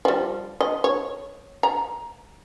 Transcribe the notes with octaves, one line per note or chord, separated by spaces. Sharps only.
F3 G3
D#5
C#5
A#5